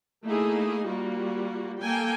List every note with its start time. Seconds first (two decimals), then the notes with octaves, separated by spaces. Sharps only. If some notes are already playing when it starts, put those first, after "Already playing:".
0.24 A3 A#3 D#4 E4 G#4
0.87 G3 A#3 F4 F#4
1.81 A#3 A4 G5 G#5